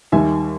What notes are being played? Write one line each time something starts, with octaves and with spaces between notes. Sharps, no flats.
D#2 D#3 G3 E5 G#5